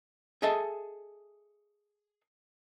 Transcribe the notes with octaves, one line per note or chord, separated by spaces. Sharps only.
G#4 A4 D#5 E5 G#5 A5